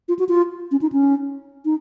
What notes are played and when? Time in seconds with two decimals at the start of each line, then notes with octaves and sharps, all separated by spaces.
0.08 F4
0.19 F#4
0.29 F4
0.71 C#4
0.82 D#4
0.92 C#4
1.65 D#4